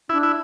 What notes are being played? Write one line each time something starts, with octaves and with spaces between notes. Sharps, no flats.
D4 E4
E4